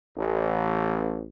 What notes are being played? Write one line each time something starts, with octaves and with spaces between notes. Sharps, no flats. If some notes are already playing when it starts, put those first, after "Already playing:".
A1